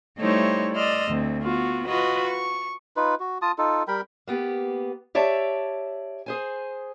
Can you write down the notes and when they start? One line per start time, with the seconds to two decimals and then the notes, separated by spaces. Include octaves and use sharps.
0.18 G3 A3 D#4 E4 C5 C#5
0.74 D5 D#5 C6 E6 F6
1.09 D2 C4
1.43 B3 F4 F#4
1.87 F4 F#4 B4 D#5
2.26 C#6
2.97 D#4 F4 B4
3.20 F#4
3.42 F4 A5 D#6
3.58 D#4 F4 A4
3.88 G3 A#4 G5 B5
4.27 A#3 B3 G4
5.15 G4 C#5 D5 E5 A5
6.26 G#4 C5 G#5